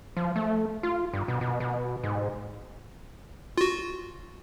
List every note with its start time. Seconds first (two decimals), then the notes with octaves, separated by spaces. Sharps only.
0.17 F3
0.36 A3
0.83 F4
1.13 G2
1.28 B2
1.41 B2
1.60 B2
2.03 G#2
3.58 F4 F#4